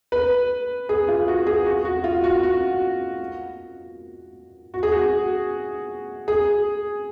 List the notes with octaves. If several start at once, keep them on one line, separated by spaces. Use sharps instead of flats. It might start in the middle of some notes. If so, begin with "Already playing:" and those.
B4
G#4
F4
F#4
G#4
F#4
F#4
F4
F#4
F#4
F#4
G#4
F#4
G#4